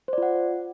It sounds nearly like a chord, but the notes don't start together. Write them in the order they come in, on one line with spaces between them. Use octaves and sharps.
C5 D5 F4 F#5